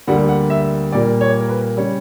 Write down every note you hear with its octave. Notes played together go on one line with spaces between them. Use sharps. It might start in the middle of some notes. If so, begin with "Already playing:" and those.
D2 D3 G3 A#3 F#5
F#5
E5
A#2 G3 A#3 D5
C#5
A#4
B4
C#3 G3 C#5